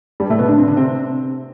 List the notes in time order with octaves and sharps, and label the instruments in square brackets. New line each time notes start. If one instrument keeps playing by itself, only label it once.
[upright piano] G2 G3
A2 A3
B2 B3
D3 D4
C3 C4
D3 D4
C3 C4